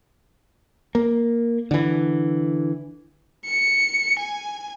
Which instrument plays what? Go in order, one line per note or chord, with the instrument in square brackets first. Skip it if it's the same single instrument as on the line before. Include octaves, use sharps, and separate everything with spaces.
[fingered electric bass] A#3
D3 E3
[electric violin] C#7
G#5